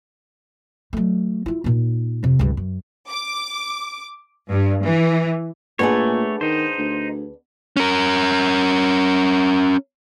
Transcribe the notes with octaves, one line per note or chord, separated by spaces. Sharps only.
F#3 A3
E4 F4
A#2 D#4
F2 C3
C#2 G2
F#2
D6
G2
E3
A#2 A3 B3 D4 G#4 C#5
D#3 D#4 C5
D2
C#4 A#4